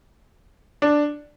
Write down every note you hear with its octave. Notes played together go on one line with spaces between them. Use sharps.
D4